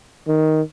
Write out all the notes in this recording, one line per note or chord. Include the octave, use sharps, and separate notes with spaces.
D#3